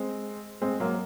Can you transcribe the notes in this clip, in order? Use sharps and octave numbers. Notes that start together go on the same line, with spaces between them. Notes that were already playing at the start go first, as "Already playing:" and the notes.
Already playing: G#3 C4
G#3 C4
F#3 A#3